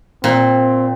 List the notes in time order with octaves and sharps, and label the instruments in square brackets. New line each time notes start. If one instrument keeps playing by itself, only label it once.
[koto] A#2 [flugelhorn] C4